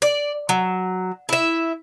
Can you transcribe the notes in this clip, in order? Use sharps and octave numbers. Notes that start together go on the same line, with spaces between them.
D5
F#3
E4 E5